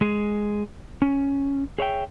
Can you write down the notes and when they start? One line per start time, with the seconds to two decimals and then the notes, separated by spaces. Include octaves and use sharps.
0.01 G#3 G#4
1.02 C#4
1.78 G#4 C#5 E5 G5